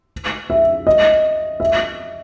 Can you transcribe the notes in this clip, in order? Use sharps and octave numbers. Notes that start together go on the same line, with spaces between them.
E5
D#5
E5